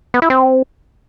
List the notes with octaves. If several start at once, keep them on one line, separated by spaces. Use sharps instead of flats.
B3
E4
C4